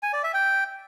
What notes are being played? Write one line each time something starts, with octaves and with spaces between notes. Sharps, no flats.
G#5
D5
E5
G5